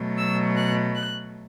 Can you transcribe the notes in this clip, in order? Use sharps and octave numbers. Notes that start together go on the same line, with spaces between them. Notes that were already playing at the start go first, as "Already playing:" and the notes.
Already playing: B2 F#3 A3
E6
F#6
F#6